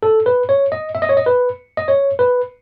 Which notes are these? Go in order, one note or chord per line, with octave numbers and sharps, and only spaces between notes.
A4
B4
C#5
D#5
E5
D#5
C#5
D#5
B4
D#5
C#5
B4